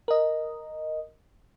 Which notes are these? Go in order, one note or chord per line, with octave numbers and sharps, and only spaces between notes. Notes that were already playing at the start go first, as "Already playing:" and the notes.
A#4 D#5